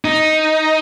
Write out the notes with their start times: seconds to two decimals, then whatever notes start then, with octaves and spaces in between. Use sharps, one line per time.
0.05 D#4